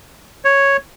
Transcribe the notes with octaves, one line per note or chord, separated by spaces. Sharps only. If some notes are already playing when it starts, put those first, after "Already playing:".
C#5